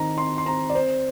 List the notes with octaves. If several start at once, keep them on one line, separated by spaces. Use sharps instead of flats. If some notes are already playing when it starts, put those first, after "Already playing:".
Already playing: D#3 C4 A#5
C4 C6
C6
C4 A#5
D5
C4 C5